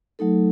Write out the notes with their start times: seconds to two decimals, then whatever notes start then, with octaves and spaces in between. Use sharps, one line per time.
0.19 F#3 A3 D#4 A4